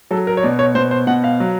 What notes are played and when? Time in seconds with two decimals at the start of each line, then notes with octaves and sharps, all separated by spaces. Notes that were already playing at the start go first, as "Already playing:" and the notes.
0.11 F#3 A4
0.27 A#4
0.37 C#5
0.43 B2 D5
0.59 C#5
0.75 B2 C5
0.91 C5
1.07 B2 F#5
1.24 F5
1.40 F#3